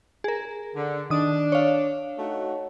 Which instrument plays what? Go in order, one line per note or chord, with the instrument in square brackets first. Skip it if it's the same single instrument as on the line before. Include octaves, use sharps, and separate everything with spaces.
[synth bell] G#4 A#4
[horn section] D3
[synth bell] D#3 D#6 [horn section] D4
[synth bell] C#5 F5
[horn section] A3 D#4 F#4